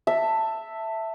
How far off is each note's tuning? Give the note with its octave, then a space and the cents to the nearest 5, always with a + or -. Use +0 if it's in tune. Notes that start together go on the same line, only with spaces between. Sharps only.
E5 +0 A5 +15